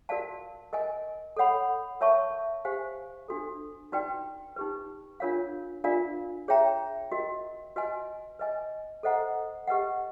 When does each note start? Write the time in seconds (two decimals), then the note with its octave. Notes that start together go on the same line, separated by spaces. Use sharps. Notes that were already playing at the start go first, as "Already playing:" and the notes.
0.09 F#4 A#4 D5 F5 A5
0.73 A#4 D#5 G#5
1.37 A4 C#5 F#5 B5
2.01 A#4 C#5 E5 A5 C#6
2.65 G4 C5 F5 G#5
3.28 D4 F#4 A4
3.92 D#4 F#4 B4 D5 G5
4.56 D#4 G4 B4
5.20 D4 F4 A#4 C#5 F5
5.84 D4 F4 A#4 D5 F5
6.48 G#4 C#5 E5 G5 A#5
7.12 F#4 A#4 D#5
7.76 F#4 B4 D#5 G#5
8.39 B4 D#5 G#5
9.03 A4 C5 D#5 F#5 A#5
9.67 G4 B4 D#5 F#5